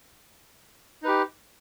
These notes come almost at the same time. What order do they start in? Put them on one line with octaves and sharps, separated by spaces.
D#4 B4 G4